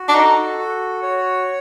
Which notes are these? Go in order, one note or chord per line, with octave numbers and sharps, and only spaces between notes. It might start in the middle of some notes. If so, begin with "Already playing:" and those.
Already playing: F#4
D4
D#4 A4
F#4
C#5